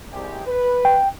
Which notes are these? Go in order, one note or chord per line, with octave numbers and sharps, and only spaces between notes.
C2 G#3 G4
B4
G5